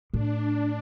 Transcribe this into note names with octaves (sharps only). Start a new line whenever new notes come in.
A2 D4